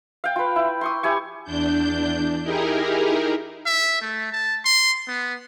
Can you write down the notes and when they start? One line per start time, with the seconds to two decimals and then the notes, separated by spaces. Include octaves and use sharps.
0.24 F5 G5
0.36 F4 B4
0.56 E4
0.81 C6 C#6 D#6
1.03 E4 G4 G#5 C#6
1.44 E2 D4 G6
2.43 D#4 E4 G4 G#4 A#4
3.66 E5
4.01 A3
4.32 A5
4.65 C6
5.08 B3